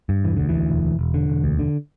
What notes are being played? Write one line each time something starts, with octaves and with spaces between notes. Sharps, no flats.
G2
E1 E3
D2 D3
E3
D2
E1
E1
E1
D3
E1
D2
D3